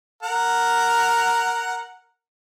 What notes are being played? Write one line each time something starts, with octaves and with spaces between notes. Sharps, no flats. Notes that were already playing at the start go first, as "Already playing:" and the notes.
A#4 F#5